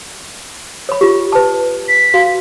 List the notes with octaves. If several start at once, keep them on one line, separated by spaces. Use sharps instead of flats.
C#5 B5
F4 G4
B4 A5
B6
F#4 F5